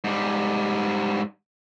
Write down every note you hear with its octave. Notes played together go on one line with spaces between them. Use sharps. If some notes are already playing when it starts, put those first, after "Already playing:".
G#2 G3